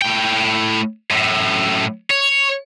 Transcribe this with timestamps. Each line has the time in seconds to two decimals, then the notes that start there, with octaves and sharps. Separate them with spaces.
0.02 A2 G5
1.11 F#2 A2
2.11 C#5